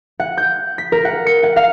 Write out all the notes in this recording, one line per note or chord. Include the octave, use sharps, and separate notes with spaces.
F#5
G6
B6
A#4
F#5
C#7
F#5
F5